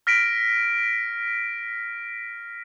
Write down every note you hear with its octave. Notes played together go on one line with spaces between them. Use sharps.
F6 A#6 B6 D7